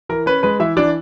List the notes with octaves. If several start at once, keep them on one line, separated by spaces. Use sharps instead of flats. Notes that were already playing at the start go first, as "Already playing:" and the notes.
E3 A#4
C#4 B4
G#3 B4
E3 E4 E5
E3 D4 D5